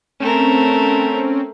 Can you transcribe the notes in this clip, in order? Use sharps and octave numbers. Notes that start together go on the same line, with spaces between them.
A3 C4 C#4 A#4